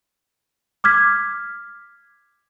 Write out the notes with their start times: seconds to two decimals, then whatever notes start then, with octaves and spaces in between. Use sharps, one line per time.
0.84 D6 F6 G#6 B6